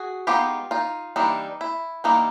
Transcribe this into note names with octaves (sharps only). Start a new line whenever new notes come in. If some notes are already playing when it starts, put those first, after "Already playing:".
Already playing: F#4 G#4
G#3 B3 D#4 F4 G4
D#4 F4
E3 G3 A#3 D4 D#4
E4
E3 G3 A#3 D4 D#4